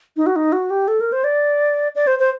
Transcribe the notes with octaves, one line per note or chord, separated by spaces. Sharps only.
D#4
F#4
D#4
F#4
G4
A4
A#4
C5
D5
D5
C5
C5